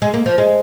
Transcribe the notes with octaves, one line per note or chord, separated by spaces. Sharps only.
G#3
A#3
F3
G#3